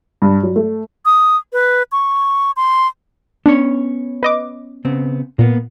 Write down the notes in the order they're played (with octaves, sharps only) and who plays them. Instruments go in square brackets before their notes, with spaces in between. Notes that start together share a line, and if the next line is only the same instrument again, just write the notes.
[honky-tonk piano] G2
F#3
A3
[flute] D#6
B4
C#6
C6
[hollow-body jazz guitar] B3 C#4 C#5 [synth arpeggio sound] D4
[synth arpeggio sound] B4 D#5 D6
[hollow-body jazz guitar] C#3 B3 C4
[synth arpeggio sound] A#2 [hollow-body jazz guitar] A#3 B3